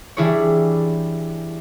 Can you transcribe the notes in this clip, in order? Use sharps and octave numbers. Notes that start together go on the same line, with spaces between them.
E3 G3 D4 E4 G#4 C#5